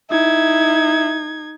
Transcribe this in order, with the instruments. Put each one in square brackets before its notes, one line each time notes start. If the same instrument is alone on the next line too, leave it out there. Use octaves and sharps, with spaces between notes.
[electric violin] D#4 G#6 [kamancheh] E4